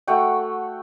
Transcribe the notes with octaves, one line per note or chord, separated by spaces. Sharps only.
A3 F#4 F#5 G5